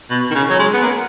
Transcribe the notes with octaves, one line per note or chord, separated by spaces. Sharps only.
B2
D#3
C#3
F#3
G#3
B3
A#3